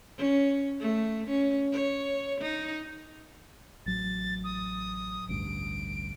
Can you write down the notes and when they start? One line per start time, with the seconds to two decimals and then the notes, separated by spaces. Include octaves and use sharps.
0.17 C#4
0.80 A3
1.27 C#4
1.72 C#5
2.41 D#4
3.86 A1 F#3 A6
4.44 D#6
5.29 A1 D2 G2 D7